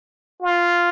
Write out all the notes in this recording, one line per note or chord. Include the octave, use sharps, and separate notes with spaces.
F4